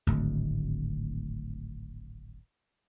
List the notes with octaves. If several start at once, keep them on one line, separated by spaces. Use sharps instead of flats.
D1 G#1 D2